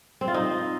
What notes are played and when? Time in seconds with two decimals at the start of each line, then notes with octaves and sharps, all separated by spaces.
0.21 C4
0.28 F4
0.34 D#4